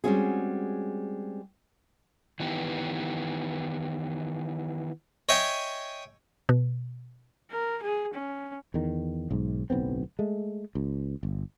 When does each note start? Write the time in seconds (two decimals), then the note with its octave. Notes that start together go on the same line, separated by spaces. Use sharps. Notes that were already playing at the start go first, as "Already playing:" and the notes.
0.04 G3 G#3 C4 C#4 F#4 G#4
2.40 D#3 E3 B3 G4
5.29 C#5 D#5 E5 G5 G#5
6.49 B2
7.51 A#4
7.83 G#4
8.14 C#4
8.74 E2 D#3
9.31 B1 G#2
9.70 D1 B1 B3 C4
10.19 G#3 A3
10.75 C#2
11.23 G1